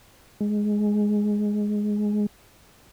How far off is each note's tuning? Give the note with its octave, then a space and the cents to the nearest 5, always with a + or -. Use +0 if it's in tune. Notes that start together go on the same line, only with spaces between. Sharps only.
G#3 +5